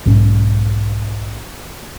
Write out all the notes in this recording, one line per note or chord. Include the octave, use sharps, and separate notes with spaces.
B1 G#2 C#4